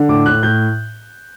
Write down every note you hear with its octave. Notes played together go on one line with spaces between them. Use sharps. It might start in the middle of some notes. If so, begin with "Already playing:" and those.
Already playing: D3
A2 D6
A2 F#6
A2 G6